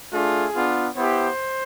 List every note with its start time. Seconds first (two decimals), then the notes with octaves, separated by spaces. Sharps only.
0.12 A3 D4 F4 G#4
0.54 B3 D4 F4
0.96 B3 E4 G4 C5